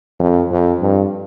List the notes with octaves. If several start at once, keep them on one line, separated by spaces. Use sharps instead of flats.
F2
F2
G2